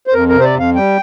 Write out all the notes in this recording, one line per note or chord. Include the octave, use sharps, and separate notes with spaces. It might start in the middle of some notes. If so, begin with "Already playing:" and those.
C5
F2 A#4
A#4
C3
C5
D5
F2 F5
G3 G5